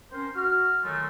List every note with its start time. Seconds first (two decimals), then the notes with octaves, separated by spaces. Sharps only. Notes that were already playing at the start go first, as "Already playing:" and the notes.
0.12 C4 C#4 A#4 C5
0.35 F#4 F6
0.84 A#2 D#3 F#3 G#3 A3